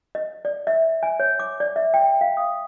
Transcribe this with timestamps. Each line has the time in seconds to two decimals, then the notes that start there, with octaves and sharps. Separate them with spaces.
0.15 D#5
0.45 D5
0.67 E5
1.03 G#5
1.20 C#5
1.39 D6
1.60 D5
1.76 E5
1.94 G5
2.21 F5
2.37 D#6